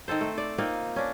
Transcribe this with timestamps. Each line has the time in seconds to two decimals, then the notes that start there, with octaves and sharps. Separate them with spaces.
0.08 D#3 C4 A4 C5
0.21 A3
0.38 D5
0.58 A#3 C4 D#4 F4
0.96 C#4 D4